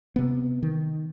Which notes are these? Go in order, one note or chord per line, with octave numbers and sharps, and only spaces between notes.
C3 B3
D#3